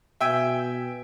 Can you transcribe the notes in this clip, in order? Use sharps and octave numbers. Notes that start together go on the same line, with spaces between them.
B2 E5 G5 G#5